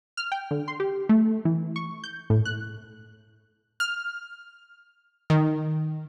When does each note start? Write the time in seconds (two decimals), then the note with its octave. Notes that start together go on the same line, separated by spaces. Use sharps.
0.17 F6
0.32 G5
0.51 D3
0.68 C6
0.80 G4
1.09 A3
1.45 E3
1.76 C#6
2.04 G6
2.30 A2
2.45 F#6
3.80 F6
5.30 D#3